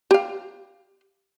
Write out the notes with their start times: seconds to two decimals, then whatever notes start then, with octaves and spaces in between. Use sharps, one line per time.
0.11 G4 F5